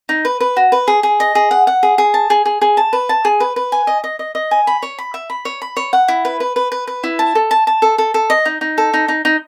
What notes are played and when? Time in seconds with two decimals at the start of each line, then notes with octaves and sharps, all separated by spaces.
0.09 D#4
0.25 B4
0.41 B4
0.57 F#4
0.72 B4
0.88 G#4
1.03 G#4
1.20 D#5
1.35 G#4
1.51 F#5
1.67 F#5
1.83 G#4
1.98 G#4
2.14 A5
2.30 G#4
2.45 G#4
2.61 G#4
2.77 A5
2.93 B4
3.09 A5
3.25 G#4
3.40 B4
3.56 B4
3.72 G#5
3.87 D#5
4.04 D#5
4.19 D#5
4.35 D#5
4.51 G#5
4.67 B5
4.83 C#5
4.98 B5
5.14 E5
5.30 B5
5.45 C#5
5.62 B5
5.77 C#5
5.93 F#5
6.08 E4
6.25 B4
6.40 B4
6.56 B4
6.72 B4
6.87 B4
7.04 E4
7.19 A5
7.35 A4
7.51 A5
7.67 A5
7.82 A4
7.98 A4
8.14 A4
8.30 D#5
8.45 D#4
8.61 D#4
8.78 A4
8.93 D#4
9.08 D#4
9.25 D#4